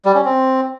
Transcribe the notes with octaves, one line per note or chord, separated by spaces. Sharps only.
G3
C#4
C4